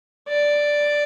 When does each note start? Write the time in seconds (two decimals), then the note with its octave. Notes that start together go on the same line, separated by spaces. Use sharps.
0.28 D5